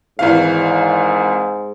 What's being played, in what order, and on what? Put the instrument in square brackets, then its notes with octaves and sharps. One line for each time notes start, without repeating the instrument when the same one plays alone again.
[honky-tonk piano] G#1 E3 F5 [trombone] G#2